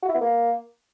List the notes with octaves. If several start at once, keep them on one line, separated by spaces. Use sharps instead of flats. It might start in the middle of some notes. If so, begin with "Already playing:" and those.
F#4
E4
B3
A#3